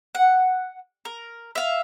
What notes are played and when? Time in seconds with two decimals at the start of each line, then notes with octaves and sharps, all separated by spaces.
0.15 F#5
1.05 A#4
1.55 E5 F5